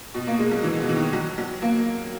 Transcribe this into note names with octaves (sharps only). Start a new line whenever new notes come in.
B2
A#3
G#3
F#3
E3
B2
E3
D#3
F#3
F#3
A#3